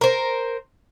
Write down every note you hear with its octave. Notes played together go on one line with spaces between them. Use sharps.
A#4 C5